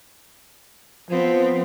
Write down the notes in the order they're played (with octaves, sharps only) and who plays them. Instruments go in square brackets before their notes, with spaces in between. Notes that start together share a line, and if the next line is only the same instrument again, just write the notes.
[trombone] F3 [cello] B3 C4